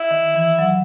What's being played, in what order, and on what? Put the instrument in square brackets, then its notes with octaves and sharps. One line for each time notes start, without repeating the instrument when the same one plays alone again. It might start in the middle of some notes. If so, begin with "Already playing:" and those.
Already playing: [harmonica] E4
[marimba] D#3
E3
F#3